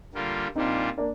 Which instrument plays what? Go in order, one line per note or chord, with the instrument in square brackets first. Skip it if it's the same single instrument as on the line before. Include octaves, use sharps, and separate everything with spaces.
[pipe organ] D3 G3 A#3 F4
[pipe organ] A#2 G3 D4 F4 [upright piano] C4 D#4
[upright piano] A#3 D4